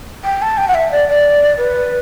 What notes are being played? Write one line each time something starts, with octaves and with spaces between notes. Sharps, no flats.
G5
A5
G5
F#5
E5
D5
D5
B4